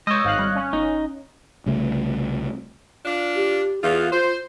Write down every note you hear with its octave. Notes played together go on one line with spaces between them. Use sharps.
G#3 C#5 D#5 E6 G6
G#1 G#2 F5 F#6
G3
C#4
G1 D#4
C2 C#3 A3
D4 F4
G4
E2 F4 G#4
F4 C5